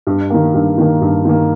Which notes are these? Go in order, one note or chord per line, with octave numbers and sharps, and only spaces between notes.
G2
D#3 A#3
G2
D#3 A#3
G2
D#3 A#3